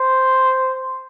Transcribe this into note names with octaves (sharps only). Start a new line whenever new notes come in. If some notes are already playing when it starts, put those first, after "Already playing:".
Already playing: C5